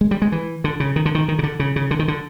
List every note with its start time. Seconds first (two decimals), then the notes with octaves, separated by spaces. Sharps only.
0.01 G#3
0.11 G3
0.22 G#3
0.32 E3
0.64 D3
0.80 C#3
0.96 D#3
1.06 D3
1.15 D#3
1.28 D#3
1.39 C#3
1.43 D3
1.60 C#3
1.76 C#3
1.91 D3
1.99 D#3
2.08 D3